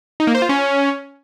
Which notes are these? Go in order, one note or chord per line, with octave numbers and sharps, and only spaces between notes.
D#4
A#3
C5
F4
C#4